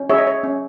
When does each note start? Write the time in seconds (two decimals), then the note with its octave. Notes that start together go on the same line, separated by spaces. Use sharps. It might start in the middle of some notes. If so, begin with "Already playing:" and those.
Already playing: C#4
0.10 G#4 C#5 E5
0.18 D#5
0.27 C#5
0.44 C#4